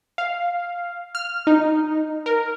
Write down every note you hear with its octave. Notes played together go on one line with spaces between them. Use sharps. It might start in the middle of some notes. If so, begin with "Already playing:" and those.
F5
F6
D#4
A#4